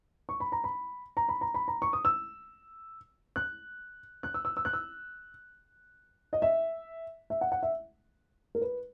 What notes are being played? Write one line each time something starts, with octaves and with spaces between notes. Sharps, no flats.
C#6
B5
A#5
B5
A#5
B5
A#5
B5
A#5
C#6
D#6
E6
F#6
F#6
E6
E6
E6
F#6
E6
D#5
E5
E5
F#5
F#5
E5
A#4
B4